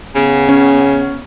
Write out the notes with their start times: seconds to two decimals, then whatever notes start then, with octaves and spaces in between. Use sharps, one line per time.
0.15 C#3 B3
0.49 C#4